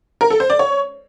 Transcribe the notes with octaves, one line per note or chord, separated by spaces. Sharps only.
A#4
A4
C5
D5
C#5